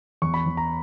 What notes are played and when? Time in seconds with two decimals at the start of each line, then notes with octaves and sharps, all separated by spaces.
0.22 E2 C#6
0.34 B5
0.46 E2
0.57 A#5